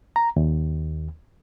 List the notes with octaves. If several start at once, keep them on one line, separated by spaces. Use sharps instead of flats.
A#5
D#2